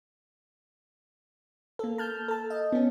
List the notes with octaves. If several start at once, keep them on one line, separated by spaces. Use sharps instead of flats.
A#3 A4
A5 F6 G6
A4 A5
D#5
B3 C#4